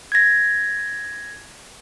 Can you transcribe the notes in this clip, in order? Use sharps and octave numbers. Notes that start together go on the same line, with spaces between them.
G#6 A#6